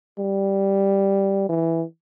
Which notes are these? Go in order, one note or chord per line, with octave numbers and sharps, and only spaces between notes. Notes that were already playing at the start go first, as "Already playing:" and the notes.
G3
E3